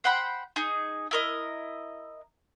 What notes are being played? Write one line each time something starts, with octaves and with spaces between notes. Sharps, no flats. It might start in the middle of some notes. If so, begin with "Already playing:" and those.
C5 F#5 G5 B5
D#4 G#4
E4 A#4 D#5